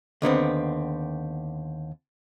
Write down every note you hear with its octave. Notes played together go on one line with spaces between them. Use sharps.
D#2 D3 B3 C4